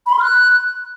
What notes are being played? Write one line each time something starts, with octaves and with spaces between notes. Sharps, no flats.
B5
C6
F6
F#6